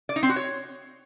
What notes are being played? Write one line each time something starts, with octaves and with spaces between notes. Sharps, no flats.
D5
D#4
C4
F#4
C#5